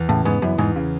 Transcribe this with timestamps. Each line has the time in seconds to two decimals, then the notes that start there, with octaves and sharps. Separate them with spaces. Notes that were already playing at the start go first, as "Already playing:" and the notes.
Already playing: E2
0.09 A2 C#3
0.25 G#2 B3
0.42 F#2 E3
0.58 E2 G#2
0.76 C#3